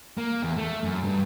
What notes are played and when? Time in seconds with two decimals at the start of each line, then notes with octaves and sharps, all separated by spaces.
0.18 A#3
0.43 E2
0.57 A3
0.84 F#2
1.04 G2